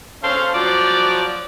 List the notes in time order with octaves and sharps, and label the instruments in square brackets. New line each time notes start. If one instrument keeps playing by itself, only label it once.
[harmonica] C#4 A4 F5 [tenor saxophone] C5
[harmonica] F3 F#3 [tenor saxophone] D5